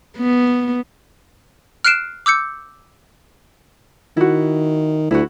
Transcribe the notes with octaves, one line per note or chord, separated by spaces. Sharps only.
B3
F6 F#6 C7 D7 E7
D6 E6 G6 C#7
D#3 E4 F#4
D2 E4 F#4